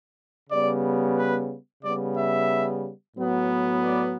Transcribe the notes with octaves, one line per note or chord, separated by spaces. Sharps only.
C#3 G3 B3 D5
B4
C#3 G3 B3 D5
E5
A2 F#3 B3
D5